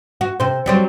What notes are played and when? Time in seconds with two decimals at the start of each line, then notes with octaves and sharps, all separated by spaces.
0.21 F#4
0.40 C3 C5
0.66 F#3 G3 C4